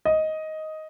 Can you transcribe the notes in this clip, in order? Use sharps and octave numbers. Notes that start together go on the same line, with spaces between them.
D#5